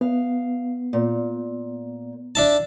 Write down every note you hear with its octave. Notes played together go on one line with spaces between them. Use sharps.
B3 F5
A#2
D4 E5 A5